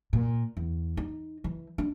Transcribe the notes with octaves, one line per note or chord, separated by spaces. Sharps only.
A#2
E2
D#4
E3
D4